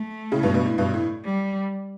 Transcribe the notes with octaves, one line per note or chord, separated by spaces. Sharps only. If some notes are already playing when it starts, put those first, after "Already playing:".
Already playing: A3
A2 C#3
G2 B2
G2 B2
A2
G2 B2
A2
G3